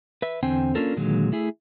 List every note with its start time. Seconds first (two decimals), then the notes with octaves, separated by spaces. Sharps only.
0.22 B4 E5
0.43 E2 D3 C4 C5 G5 G#5
0.75 A#3 C#4 D4 F4 A4 A#4
0.97 A#2 D3 D#3 F#3 G#3
1.32 A3 E4 G#4